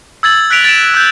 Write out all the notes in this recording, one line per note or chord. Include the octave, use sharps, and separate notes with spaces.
E6 G#6 A6 F#7
F#6 B6 D7 F7
A6 D7 E7
E6 G6